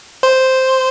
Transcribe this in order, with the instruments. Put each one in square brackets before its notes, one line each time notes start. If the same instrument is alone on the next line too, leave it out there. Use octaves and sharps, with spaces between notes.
[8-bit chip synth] C5